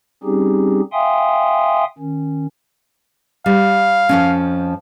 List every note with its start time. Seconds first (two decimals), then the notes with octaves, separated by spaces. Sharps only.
0.24 G3 C4 C#4 D#4 G4 G#4
0.93 E5 F5 G5 G#5 C6 D#6
1.99 D#3 C#4
3.46 G3 F5
4.09 F2 F3 C#4